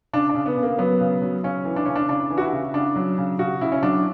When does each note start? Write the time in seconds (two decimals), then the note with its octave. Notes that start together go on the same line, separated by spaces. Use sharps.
0.13 C#3 D4
0.30 D4
0.35 C#3
0.46 B3
0.57 C#3
0.63 A#3
0.79 F#3 B3
1.01 C#3
1.22 F#3
1.43 C#3 C#4
1.65 E3
1.76 D4
1.85 C#3 C#4
1.96 D4
2.09 C#3 D4
2.30 E3
2.38 F#4
2.41 E4
2.53 C#3
2.74 C#3 D4
2.96 F#3
3.18 C#3
3.39 C#3 F#4
3.61 C#3 E4
3.72 C#4
3.83 F#3 D4